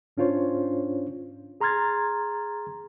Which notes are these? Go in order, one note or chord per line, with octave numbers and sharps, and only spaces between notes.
G#2 C#4 D4 F4 C5 C#5
G#4 A#5 C6 F6 G#6 A6